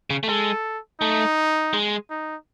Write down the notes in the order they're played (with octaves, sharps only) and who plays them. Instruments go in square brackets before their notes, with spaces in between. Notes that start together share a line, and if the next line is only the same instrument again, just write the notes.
[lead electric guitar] C#3
A3
[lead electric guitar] G#3 [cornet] A4
[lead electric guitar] A3 [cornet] D#4
[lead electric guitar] G#3
[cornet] D#4